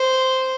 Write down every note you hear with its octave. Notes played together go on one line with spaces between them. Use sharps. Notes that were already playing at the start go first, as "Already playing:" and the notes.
Already playing: C5